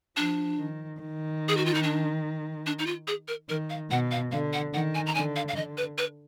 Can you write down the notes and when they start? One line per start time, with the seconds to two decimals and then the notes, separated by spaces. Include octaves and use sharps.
0.16 F3 D4
0.58 D#3
1.00 D#3
1.48 G#4
1.57 F#4
1.66 F4
1.74 D#4
1.83 D4
2.66 D4
2.79 D#4
2.86 F4
3.07 G#4
3.28 A#4
3.49 D#3 A#4
3.70 F5
3.90 B2 F#5
4.11 F5
4.32 D3 F5
4.53 F#5
4.73 D#3 F#5
4.95 G#5
5.06 A#5
5.15 D3 G#5
5.36 F5
5.48 F5
5.56 D3 D#5
5.77 B4
5.98 B4